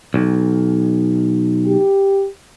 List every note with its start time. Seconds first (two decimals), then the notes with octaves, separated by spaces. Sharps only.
0.14 B1
1.66 G4